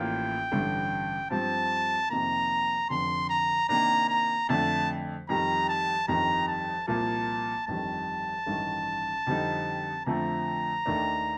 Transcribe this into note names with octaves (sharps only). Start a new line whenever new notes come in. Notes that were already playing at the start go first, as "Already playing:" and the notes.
Already playing: A1 A2 F3 A#3 F4 G5
A1 G2 D3
G2 F3 C4 G4 A5
F2 C3 D#3 A#3 A#5
F1 F2 D3 C6
A#5
C3 D#3 A#3 D4 A#5
A#5
F2 D3 A3 D4 A5
F2 D#3 G3 A#5
A5
G1 F2 D#3 G3 A#5
A5
C2 A#2 F3 A#3 A5
G1 F2 D#3 G3 A5
A1 G2 D#3
F2 D3 G3 C4 D#4
F2 D3 F3 A3 A#5
D#2 D#3 A3 D4